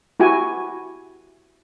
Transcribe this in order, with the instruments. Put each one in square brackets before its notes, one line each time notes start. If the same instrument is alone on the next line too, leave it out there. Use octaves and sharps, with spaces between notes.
[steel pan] E4 F#4 G4 G#5